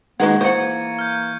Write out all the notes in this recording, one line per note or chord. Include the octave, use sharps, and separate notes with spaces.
A#2 D#3 G#3 A#3 F#4 B4 F#5 G#6
E3 C5 F#5 C#6 C#7
F6 G6